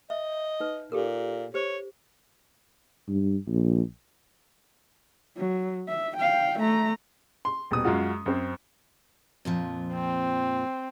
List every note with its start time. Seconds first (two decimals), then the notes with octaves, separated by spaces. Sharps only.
0.10 D#5 E5
0.60 D#4 B4
0.92 A#2 G4 A4 A#4
1.54 G4 C5 C#5
3.08 G2
3.47 A#1
5.37 F#3
5.88 E5
6.16 F5 G5
6.59 A3 A#5
7.45 C6
7.71 D#1 B2 D#6
7.84 F#2 G#3 F4 F#4
8.26 F#2 C4
9.45 F2 A#2 F3
9.93 C4